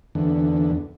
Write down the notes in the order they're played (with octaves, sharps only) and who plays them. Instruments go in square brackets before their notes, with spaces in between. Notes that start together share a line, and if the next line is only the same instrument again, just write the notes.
[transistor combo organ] E2 D3